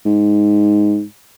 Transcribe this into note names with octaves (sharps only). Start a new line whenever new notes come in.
G#2